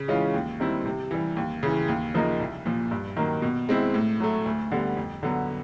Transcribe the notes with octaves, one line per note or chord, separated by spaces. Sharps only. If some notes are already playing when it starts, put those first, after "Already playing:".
Already playing: C#3
E3 G#3 C#4 F4
D#2
D#3 G3 C4 E4
C3
E3 G3
D#2
C#3 E3
D#2
C#3 F3 A#3 D#4
C2
A#2 F3
G2
D#3 F#3 A#3
B2
G#3 C4 E4
A2
F#3 A3
D2
D3 G3 B3
F2
D3 F#3 B3